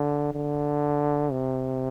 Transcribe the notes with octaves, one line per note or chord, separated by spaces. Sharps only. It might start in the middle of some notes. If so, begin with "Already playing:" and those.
Already playing: D3
D3
C3